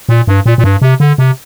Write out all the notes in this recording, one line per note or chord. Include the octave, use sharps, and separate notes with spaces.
A#2
G2
A#2
A#2
G2
C3
D3
C3